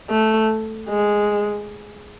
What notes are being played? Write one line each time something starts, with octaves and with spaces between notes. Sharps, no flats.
A3
G#3